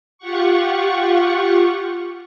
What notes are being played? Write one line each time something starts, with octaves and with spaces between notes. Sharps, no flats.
F4 G4 F#5 C#6